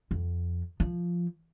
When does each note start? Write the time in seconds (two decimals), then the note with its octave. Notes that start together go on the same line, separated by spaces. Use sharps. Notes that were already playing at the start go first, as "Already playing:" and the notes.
0.11 F2
0.80 F3